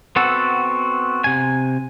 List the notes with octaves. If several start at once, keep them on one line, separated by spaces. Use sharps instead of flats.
B3 C4 F#4 A4
C3 G#5